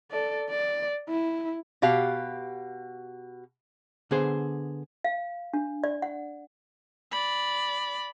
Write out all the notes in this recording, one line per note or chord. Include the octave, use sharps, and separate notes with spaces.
A4 D5
D5
E4
B2 F#4 G4 F5
D3 B3 G#4 C5
F5
D4
D5
F#5
D5 B5